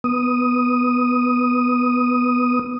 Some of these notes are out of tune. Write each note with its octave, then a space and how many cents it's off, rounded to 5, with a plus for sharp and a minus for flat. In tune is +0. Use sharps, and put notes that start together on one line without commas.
B3 +0 D#6 +0